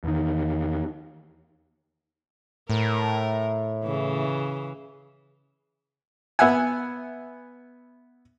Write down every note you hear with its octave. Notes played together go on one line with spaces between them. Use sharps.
E2 D#3
A2 A#4
C#3 E3
B3 E5 F#5 G#5